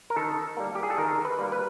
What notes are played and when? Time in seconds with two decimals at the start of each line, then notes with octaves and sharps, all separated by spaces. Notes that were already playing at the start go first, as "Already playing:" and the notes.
0.10 A#4
0.16 D#3 A4
0.57 G3 A#3
0.75 G4
0.83 G#4
0.90 A4
0.98 D#3 A#4
1.25 B4
1.39 G3 A#3
1.52 B4